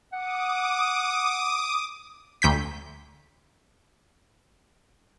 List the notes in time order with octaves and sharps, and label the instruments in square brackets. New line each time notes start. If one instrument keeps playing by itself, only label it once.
[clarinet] F#5 [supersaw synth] D6 D#6
[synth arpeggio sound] D2 G6 B6